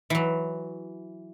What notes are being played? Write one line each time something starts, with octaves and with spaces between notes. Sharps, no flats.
E3 F#3